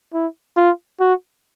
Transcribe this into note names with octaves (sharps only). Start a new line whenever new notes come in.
E4
F4
F#4